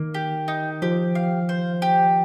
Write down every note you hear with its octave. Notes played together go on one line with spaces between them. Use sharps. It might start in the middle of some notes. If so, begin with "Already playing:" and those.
Already playing: D#3 A#3
G4
D#4
F3 G4
F5
C5
G4